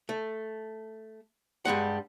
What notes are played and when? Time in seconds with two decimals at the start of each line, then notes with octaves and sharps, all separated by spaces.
0.09 A3
1.65 G2 G3 G#3 F#5